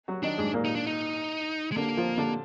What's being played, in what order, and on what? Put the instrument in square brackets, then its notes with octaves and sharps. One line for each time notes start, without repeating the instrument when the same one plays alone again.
[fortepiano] F#3 F#4
[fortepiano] D#3 D#4 [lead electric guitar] D4
[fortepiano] G#2 G#3
A#2 A#3
[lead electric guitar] D#4
D4
D#4
G#3
[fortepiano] D3 D4 [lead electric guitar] A#3
[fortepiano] F3 F4
D3 D4